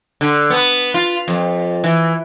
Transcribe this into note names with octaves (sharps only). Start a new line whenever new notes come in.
D3
B3
F4
F2
E3